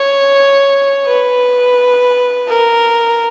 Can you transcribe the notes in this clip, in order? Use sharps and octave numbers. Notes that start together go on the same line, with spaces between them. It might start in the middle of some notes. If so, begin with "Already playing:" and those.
Already playing: C#5
B4
A#4